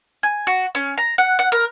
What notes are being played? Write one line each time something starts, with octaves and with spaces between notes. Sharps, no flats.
G#5
F#4
C#4
A#5
F#5
F#5
A#4